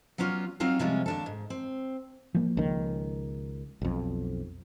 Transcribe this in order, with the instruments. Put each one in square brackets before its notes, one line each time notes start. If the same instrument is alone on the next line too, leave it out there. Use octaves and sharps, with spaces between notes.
[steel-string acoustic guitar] F#3 B3 C#4 F4 D5
F#3 C4 D#4 F4 F5
C3 F3 G3 G#3 C#4 F4
D#2 D4 A4
G#2
C4
[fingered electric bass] F3 A#3
[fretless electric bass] C#2 D#3
B1 F2